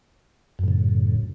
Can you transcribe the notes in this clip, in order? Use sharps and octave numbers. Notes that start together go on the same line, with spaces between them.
F#2 A2 C#3